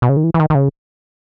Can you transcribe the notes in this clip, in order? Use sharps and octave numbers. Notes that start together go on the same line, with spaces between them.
B2
C#3
D#3
E3
E3
D#3
D#3
C#3